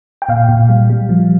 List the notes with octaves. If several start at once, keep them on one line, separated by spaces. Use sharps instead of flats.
G5
A#2 F5
A#2
G3
G3
F3